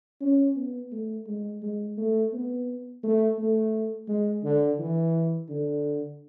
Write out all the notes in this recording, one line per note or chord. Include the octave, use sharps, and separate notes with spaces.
C#4
B3
A3
G#3
G#3
A3
B3
A3
A3
G#3
D3
E3
D3